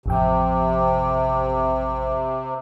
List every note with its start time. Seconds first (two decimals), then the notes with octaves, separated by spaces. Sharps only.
0.06 A1 F2 C3 G5